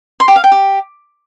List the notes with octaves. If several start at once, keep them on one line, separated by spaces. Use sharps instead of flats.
C6
G4
F5
G5
G4